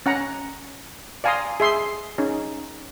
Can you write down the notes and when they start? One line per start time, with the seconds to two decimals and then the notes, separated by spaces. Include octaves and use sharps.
0.06 C#4 F#5 A#5
1.24 D5 F5 G#5 A#5 C6 D#6
1.60 G#4 E5 C6
2.18 C#4 D#4 G#4